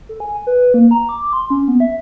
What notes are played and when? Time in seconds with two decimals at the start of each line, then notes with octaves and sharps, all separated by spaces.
0.09 A4
0.20 G#5
0.47 B4
0.74 A#3
0.91 A#5
1.09 D6
1.33 C6
1.50 C#4
1.68 B3
1.80 E5